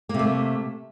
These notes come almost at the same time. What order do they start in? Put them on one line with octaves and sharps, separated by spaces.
A#3 C3 A3